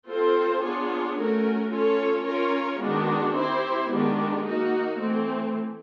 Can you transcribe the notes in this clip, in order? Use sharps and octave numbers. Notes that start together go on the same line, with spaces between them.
C4 F4 A4 C5
B3 D4 F4 G#4 C#5
A3 C#4 F#4 A#4
C#4 F4 A4 C#5
C#4 F4 A#4 C#5
D#3 G#3 B3 D4 F#4
C4 E4 G4 C5
D#3 G#3 B3 D4 G4
A#3 D#4 F#4
E3 A3 C4